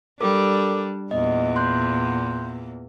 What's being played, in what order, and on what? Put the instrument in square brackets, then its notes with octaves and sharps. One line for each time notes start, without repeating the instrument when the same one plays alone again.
[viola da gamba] G3 D4 [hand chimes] A4 A#4 D6
[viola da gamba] E2 A#2 [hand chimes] D#5
[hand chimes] C6 F#6 G6